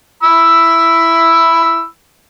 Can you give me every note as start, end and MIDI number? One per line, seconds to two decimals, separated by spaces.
0.23 1.86 64
0.23 1.86 83
0.23 1.86 88